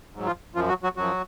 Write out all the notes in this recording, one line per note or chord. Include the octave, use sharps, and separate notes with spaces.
G#2 F#3
F3 F4
F#2 F3 F4
F#3 F#4
F#3 F#4
F#2 F3 F#3 F#4